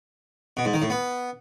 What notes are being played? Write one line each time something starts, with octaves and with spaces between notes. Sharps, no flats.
B2
G#2
D#3
A2
B3